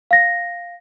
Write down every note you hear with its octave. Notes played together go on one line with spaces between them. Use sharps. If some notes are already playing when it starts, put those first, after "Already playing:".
F5 A#6